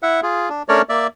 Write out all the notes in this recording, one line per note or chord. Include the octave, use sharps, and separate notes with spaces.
E4 E5 F#5
F4 G#4
D4
A3 C#4 D4 A#4 C#5 D5
A#3 D5 E5